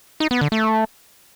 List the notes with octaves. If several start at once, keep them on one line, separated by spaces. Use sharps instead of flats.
D#4
B3
D3
A3